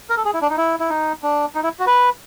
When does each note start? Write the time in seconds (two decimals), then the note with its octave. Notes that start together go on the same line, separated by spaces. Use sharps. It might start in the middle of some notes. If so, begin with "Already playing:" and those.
0.10 A#4
0.17 A4
0.25 G#4
0.34 E4
0.42 D4
0.50 D#4
0.57 E4
0.79 E4
0.90 D#4
1.23 D4
1.55 D#4
1.63 E4
1.80 F#4
1.87 B4